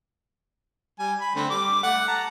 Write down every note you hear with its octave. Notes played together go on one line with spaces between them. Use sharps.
G3 G#5
B5
D3 A3 C4
G3 D6
A3 F#5
A5 A#5